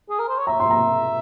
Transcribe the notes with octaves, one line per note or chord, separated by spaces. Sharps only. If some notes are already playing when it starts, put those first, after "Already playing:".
G#4
A#4
C5
C#5
E5 A#5
C6
A#5